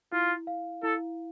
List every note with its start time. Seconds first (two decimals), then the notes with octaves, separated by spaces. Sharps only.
0.12 E4 F4
0.47 F5
0.83 E4 A4